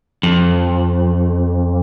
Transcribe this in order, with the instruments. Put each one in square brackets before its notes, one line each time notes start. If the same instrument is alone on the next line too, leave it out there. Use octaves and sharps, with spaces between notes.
[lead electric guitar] F2